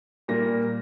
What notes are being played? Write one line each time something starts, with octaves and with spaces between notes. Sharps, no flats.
A#2 G3 A#3 A#6